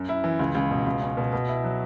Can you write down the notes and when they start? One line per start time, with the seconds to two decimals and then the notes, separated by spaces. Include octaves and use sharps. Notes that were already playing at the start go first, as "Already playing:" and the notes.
Already playing: F#2
0.09 E4
0.24 E3
0.39 C#2
0.55 C#2
0.71 B2
0.86 C#2
1.02 C#4
1.17 B2
1.33 B2
1.48 E4
1.64 F#3